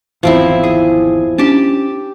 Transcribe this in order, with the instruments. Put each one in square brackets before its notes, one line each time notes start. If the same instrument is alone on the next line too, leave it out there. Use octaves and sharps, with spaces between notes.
[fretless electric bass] G#1 E2 [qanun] F3 C4 E4
[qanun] G#4
[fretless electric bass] C#4 D4 [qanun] G4 A5